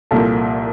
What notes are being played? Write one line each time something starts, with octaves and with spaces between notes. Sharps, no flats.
C2 A#2 F3 A4